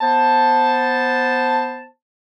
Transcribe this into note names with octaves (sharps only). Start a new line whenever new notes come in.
B3 C5 A5